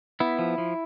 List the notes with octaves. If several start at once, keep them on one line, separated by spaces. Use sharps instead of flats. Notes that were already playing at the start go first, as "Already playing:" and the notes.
B3 E4
F3
F3